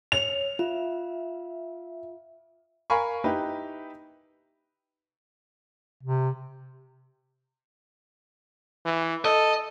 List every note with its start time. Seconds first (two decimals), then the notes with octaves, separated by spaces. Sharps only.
0.12 C#5 F7
0.59 F4 E5
2.90 A#4 F5 G#5 B5 C#6
3.24 D#4 E4 G4 B4
6.03 C3
8.85 E3
9.25 A4 D#5